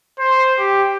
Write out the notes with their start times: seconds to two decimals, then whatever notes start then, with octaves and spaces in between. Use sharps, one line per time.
0.19 C5
0.59 G4